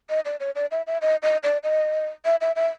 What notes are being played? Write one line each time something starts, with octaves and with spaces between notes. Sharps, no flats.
D#5
D5
C#5
D5
E5
E5
D#5
D#5
D5
D#5
E5
E5
E5